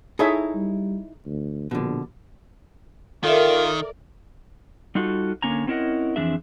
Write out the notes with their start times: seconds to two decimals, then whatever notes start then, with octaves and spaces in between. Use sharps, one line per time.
0.19 D#4 E4 G#4 A4 C#5 E5
0.55 G3
1.26 D2
1.71 A#1 B2 D3
3.24 D#3 F4 A4 A#4 D5 E5
4.95 G3 D#4 F4 F#4 A4
5.42 D3 A#3 C#4 G#5 A#5
5.67 C4 C#4 E4 A#4 D#5 F#5
6.16 F2 E3 C4 D4 G#4 E5